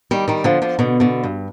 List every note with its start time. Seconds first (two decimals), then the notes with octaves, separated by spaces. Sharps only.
0.11 D#3 G3
0.28 D#3 G3
0.44 D3 F3
0.62 D3 F3
0.79 B2 D3
1.00 B2 D3
1.24 G2